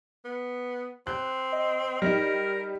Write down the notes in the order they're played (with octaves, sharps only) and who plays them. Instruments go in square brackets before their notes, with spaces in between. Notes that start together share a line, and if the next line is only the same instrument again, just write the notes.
[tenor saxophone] B3
[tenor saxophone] C4 [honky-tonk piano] F#6
[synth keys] D#5
[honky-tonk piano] G3 D#4 [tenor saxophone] A#4